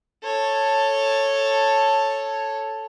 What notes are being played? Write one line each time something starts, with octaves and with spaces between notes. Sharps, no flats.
A4 C#5